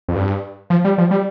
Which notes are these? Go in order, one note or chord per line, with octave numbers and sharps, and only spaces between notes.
F2
G2
F3
G3
F3
G3